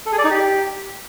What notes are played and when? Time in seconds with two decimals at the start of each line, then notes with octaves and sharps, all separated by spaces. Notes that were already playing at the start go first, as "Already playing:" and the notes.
0.06 A4
0.12 G#4
0.18 D5
0.24 D#4
0.31 G4